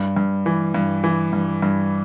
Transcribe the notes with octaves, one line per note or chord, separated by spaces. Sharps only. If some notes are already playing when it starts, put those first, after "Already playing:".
Already playing: G2
G2
E3
G2
E3
G2
G2